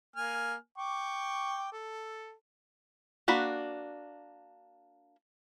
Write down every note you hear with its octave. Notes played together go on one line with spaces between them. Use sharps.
A#3 G#5 F6
G5 C#6 D6
A4
A#3 D4 F#4 B5